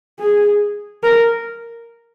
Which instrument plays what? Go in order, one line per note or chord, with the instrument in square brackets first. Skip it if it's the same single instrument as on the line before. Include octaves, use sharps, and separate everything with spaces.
[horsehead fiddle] G#4
A#4